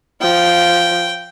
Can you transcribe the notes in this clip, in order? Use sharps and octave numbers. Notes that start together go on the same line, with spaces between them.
F3 G5